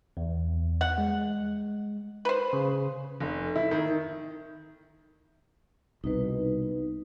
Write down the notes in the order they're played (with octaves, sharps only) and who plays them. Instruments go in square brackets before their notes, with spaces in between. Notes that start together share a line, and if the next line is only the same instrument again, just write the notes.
[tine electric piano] E2
[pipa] F#5
[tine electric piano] G#3
[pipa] B4 C5
[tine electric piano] C#3
[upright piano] F1
E4
D#3
[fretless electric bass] C2 B2 [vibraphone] D#4 B4